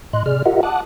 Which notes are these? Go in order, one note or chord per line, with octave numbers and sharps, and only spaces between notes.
A2 D#5 C6 F#6
C3 G#4 D5 F6
F4 G4 A#4 D#5 E5 F#5
F#5 A5 D6 D#6 F#6